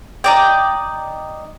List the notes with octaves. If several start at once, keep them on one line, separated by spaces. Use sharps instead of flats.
D#4 D5 G5